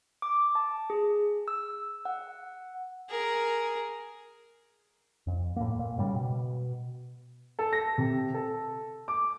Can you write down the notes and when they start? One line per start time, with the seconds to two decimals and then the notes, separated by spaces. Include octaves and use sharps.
0.22 D6
0.55 A5
0.90 G#4
1.48 E6
2.05 F#5
3.10 G#4 A#4
5.27 F2
5.56 A2 A#3
5.79 A#2
5.98 G#2 C#3 G3
6.13 B2
7.59 A4
7.73 A#6
7.98 C3
8.34 A4
9.08 D6